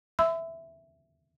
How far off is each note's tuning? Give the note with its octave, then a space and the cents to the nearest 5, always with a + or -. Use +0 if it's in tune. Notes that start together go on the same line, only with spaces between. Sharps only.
E5 +0 B5 +45 E6 +0